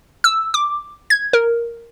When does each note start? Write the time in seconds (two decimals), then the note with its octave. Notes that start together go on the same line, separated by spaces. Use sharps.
0.24 E6
0.54 D6
1.10 G#6
1.33 A#4